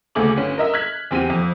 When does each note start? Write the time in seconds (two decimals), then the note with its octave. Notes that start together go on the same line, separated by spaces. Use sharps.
0.15 D2 C#3 A3 G#4 D6 F#7
0.36 G1 C#4
0.58 A#4 D#5 E5
0.74 F6 F#6 G#6 B6
1.11 E2 C4 G4 D#7
1.30 F2